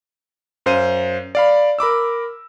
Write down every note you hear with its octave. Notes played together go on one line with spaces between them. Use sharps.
F#2 C5 F5 D#7
D5 F5 B5
A#4 B5 D6 E6